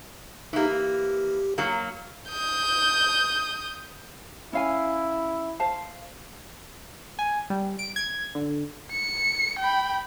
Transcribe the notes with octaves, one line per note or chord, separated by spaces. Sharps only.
E3 A#3 D#4 G4
G4
F#3 A#3
D#6 G6
C#4 E4 F5 G#5
C5 F5 A5
G#5
G3
D7
G#6
D3
C#7
G5 B5